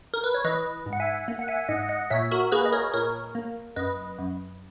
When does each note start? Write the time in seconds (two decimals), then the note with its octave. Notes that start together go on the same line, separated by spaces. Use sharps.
0.14 A#4
0.24 B4
0.34 C#5
0.44 E3 B4 D#5
0.86 G#2
0.93 F#5
1.00 E5 G#5
1.28 A#3
1.39 F#5
1.48 E5 G#5
1.69 G#2 D#5 F#5
1.89 D#5 F#5
2.10 A#2 C#5 E5
2.31 F#4 A#4
2.52 A#3 G#4 B4
2.66 D#5
2.72 A#4 C#5
2.94 A#2 A#4 C#5
3.35 A#3
3.76 F#2 B4 D#5
4.18 F#2